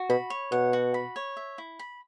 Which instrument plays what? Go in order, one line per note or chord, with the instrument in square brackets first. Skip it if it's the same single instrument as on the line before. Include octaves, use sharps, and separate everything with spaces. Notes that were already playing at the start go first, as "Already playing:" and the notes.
Already playing: [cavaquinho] F#4
[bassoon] B2 [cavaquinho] B5
[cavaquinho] C#5
[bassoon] B2 [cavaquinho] F#5
[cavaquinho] F#4
B5
C#5
E5
E4
B5